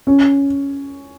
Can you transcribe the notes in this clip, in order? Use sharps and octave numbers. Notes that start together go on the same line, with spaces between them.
C#4